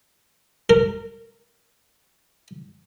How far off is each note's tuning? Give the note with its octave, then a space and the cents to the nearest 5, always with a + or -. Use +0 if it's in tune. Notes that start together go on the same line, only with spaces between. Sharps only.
A#4 -20